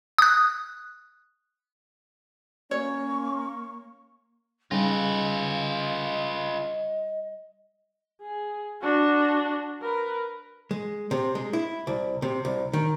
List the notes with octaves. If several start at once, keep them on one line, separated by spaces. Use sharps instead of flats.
D#6 F#6
A#3 C#4 C#5 C#6
C#3 G3 D#4 F4 B4 D#5
G#4
D4 F#4
A#4 B4
G#3
C3
G#3
E4
C2
C3
C2
D#3